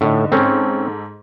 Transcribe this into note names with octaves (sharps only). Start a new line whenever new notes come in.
A2 D3 D#4
G#2 C4 C#4 A4